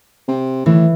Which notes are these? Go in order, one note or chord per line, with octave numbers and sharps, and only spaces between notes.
C3
A2 E3